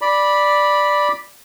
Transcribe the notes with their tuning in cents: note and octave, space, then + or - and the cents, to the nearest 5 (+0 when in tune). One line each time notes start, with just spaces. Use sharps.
D5 +0 B5 -10